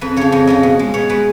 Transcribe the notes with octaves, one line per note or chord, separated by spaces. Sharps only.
F2 B4
C#3 F3 C#5
F2 D#5
C#3 F3 D#5
B2
G#3
B2 C#5
G#3 B4